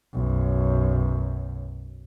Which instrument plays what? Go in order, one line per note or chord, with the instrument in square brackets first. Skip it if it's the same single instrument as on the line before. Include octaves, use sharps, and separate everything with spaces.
[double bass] B1 F#2